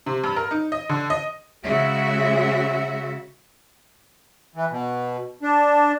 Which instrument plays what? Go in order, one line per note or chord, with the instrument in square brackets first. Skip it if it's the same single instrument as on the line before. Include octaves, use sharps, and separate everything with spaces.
[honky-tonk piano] C3
G2
A#4
D#4
D#5
D3
D#5
[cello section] C#3 G#3 F#4 E5
[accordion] E3
B2
D4